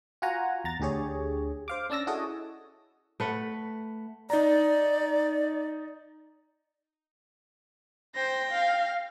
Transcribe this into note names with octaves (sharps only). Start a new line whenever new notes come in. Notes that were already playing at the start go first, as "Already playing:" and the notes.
F4 F#4 F#5 G#5 A#5
E2 A#5 A6
D2 D3 G4 G#4 C#5
C5 F5 D6
C#4 D4 A5 E6 A#6
E4 F#4 G#4 A4 C#5 D#5
A3 B4 F#5
D#4 D5 A#5
C5 G5 A#6
F5